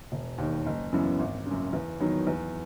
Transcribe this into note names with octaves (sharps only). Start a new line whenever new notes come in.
E1
D#2 D#3
F#1
F#2 C#3 E3 B3
G#1
C#3
F#2
E2
D#3 F#3 B3 D#4
E2